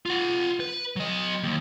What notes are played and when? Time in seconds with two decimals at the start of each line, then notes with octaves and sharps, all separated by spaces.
0.06 F4 F#5
0.60 B4
0.96 F#3 D#5
1.43 D#2